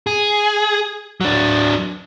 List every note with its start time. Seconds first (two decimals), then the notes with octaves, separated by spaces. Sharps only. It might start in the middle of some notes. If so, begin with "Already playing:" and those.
0.07 G#4
1.21 F#3 D4